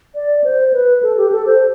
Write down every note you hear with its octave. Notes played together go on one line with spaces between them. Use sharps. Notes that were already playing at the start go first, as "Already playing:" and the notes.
D5
C5
B4
A4
G4
A4
C5